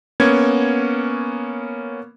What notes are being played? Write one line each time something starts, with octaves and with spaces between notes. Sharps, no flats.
A#3 B3 C#4 G#6